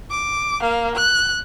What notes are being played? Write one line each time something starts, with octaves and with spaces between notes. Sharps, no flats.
D6
A#3 F5
F#6